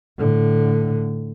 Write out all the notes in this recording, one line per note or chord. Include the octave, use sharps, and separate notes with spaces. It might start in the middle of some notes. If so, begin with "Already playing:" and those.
A2 D3